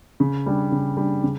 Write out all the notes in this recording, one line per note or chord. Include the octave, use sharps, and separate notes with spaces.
C#3
G3 D4
C#3
G3 D4
C#3